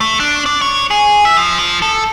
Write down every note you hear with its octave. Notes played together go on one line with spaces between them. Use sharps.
A3
D4
D5
C#5
G#4
E5
F3
F3
A4